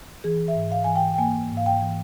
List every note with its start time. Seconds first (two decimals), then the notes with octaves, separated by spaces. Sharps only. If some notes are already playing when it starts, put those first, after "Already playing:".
0.24 E3 G#4
0.48 E5
0.55 G#2
0.72 F5
0.84 E3 G#5
0.96 G5
1.14 G5
1.18 A#3 G#5
1.51 G#2
1.57 F5
1.66 G5
1.82 E3